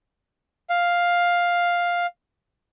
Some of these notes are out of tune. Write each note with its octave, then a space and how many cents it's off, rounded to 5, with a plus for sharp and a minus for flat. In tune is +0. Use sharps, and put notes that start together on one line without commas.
F5 +5